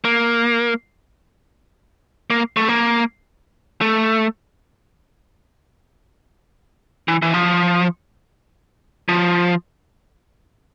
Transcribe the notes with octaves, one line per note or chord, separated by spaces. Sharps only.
A#3
A#3
A3
A#3
A3
E3
E3
F3
F3